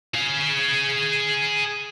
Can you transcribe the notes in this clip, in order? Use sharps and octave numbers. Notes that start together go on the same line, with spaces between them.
G#4 F5